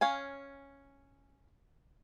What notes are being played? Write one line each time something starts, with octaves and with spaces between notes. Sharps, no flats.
C#4 F5 G#5